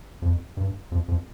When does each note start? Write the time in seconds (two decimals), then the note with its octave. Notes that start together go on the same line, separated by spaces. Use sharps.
0.22 F2
0.57 G2
0.92 F2
1.08 F2